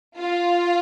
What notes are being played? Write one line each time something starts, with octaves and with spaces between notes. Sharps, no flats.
F4